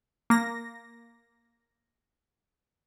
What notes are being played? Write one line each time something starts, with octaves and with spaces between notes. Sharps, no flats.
A#3 A#6